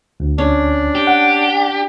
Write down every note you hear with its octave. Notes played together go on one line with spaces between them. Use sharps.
D2
C#4 D4
G4
F#5